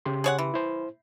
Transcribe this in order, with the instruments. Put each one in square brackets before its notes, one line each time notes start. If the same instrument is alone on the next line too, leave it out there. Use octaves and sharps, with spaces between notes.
[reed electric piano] C#3 G4 C6
[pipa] G#4 C#5 F#5
E3
[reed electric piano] E4 C5